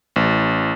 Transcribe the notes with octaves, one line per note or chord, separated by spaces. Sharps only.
A1